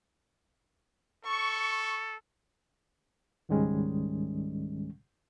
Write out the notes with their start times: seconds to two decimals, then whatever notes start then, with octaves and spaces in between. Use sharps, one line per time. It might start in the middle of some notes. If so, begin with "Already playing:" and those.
1.25 A4 C#6
3.49 C#2 G#2 D#3 G3 G#3 C#4